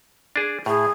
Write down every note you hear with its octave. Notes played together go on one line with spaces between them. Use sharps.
D4 G#4
A2 G#4